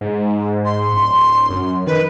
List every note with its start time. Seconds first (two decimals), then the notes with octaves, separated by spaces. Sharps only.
0.01 G#2
0.65 C6
0.92 D1
1.50 F#2
1.87 D#3 B4